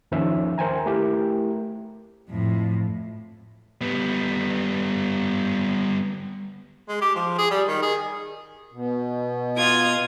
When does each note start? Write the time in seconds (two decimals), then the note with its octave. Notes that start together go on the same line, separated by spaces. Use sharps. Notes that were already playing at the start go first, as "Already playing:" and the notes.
0.12 D#2 D#3 F3 C#4 E5
0.58 A#4 C5 G5 G#5 A#5
0.86 A3 E4 G4 A#4
2.30 F2 A2
3.81 G3 B3
6.89 G#3
7.01 G4
7.16 F3
7.38 G#4
7.51 G3
7.67 D#3
7.82 G#4
8.72 B2
9.57 F4 D#6 G#6